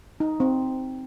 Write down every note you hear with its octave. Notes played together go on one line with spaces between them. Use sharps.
D#4
C4